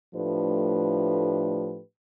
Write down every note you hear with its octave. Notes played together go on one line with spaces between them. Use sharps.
A2 F3 A3 D4 G4 B4